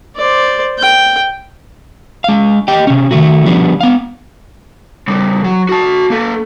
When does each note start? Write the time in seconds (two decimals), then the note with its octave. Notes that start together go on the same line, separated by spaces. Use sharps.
0.16 C5 D5
0.78 G5
2.24 G#3 F5
2.68 G4 D#5 G5
2.87 C3 C#4
3.11 D#3 A3 F#4
3.46 F3 G3 B3 D4
3.81 B3 F5
5.08 C#3 G3
5.44 F#3
5.69 F#4 A5
6.10 A#3 A4